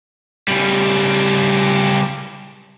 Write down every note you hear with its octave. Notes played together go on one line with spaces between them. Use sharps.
C#3 G3